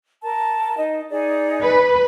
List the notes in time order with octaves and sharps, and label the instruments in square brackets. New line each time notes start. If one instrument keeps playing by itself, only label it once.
[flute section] A#4 A5
D#4 D#5
D#4 G#4 D5
[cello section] B4